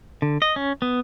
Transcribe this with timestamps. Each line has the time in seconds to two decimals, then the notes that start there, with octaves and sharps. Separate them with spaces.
0.22 D3
0.42 D#5
0.56 C#4
0.82 B3